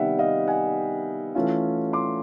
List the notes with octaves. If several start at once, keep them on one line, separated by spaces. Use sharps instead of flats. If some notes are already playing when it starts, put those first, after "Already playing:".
Already playing: C3 D#3 G3 B3 E5 F#5 G5
D#5 F5
F#5 G#5
E3 A3 C#4 F4
C6 D6